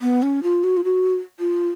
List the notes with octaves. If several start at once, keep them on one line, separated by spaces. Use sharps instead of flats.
B3
C#4
F4
F#4
F4
F#4
F4